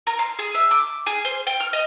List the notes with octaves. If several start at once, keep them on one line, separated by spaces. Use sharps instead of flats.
A#4
C6
G#4
E5
D6
G#4
C5
G5
F6
D#5